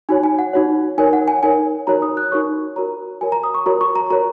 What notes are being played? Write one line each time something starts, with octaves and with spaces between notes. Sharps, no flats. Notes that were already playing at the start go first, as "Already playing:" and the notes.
D#4 F#4 C#5 G#5
G#5
F#5
D#4 F#4 C#5
D#4 A#4 C#5 G#5
F#5
G#5
D#4 A#4 C#5 G#5
D#4 F#4 A#4 C#5 A#5
D#6
F#6
D#4 F#4 A#4 C#5 C#6
F#4 A#4 C#5 A#5
F#4 A#4 C#5 G#5
A#5
D#6
C#6
F#4 A#4 C#5 A#5
C#6
A#5
F#4 A#4 C#5 A#5